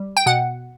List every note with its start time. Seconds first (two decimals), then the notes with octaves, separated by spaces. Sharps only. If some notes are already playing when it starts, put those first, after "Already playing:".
Already playing: G3
0.17 G5
0.26 B2 F#5